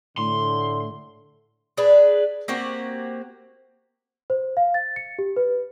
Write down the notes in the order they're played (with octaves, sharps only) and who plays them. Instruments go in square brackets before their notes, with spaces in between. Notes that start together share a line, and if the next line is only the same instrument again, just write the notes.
[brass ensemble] A2 D3 A3 [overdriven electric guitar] C6
[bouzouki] D4 G#4 B4
A#3 C4 F#4 G4
[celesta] C5
F5
A6
C#7
G4
B4